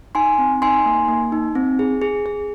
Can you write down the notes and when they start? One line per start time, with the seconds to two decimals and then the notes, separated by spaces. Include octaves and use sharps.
0.15 D#4 G#5 C6
0.38 C4
0.62 D#4 G#5 C6
0.86 A#3
1.08 A#3
1.32 D#4
1.55 C4
1.79 G#4
2.02 G#4
2.26 G#4